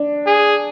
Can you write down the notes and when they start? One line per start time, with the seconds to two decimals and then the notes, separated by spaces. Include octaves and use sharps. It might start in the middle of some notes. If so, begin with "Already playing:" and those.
Already playing: D4
0.27 G#4